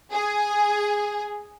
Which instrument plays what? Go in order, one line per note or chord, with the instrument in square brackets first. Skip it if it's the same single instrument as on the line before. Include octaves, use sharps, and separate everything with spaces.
[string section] G#4